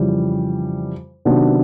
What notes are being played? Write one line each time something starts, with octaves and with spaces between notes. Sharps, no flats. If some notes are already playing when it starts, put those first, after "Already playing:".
Already playing: F2 C#3 E3 G3
C3 D#3 F#3 B3 D4